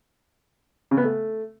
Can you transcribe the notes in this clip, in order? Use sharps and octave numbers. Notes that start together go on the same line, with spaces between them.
C#3
B3
A3